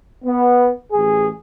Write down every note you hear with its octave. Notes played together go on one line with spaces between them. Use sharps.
B3
A1 G#4